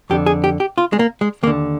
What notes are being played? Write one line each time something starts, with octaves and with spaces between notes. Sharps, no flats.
F2 D3 G4
G#4
G4
G4
F4
G#3
A#3
G#3
D#2 D3 A#3